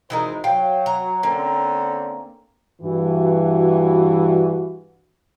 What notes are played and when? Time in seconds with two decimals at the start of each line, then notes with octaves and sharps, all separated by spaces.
0.10 G#1 E3 G#3 D#4 A#4 C5
0.44 F#3 F5 G5
0.86 A#5
1.23 D3 A#3 C4 C#4
2.82 G2 E3 F#4